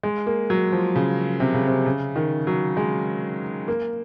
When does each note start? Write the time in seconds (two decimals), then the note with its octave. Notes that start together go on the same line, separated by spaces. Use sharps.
0.03 G#3
0.27 A#3
0.50 F#3
0.72 F3
0.95 C#3
1.40 C3
1.54 C#3
1.68 C3
1.86 C#3
2.16 D#3
2.47 F#3
2.77 G#3
3.68 A#3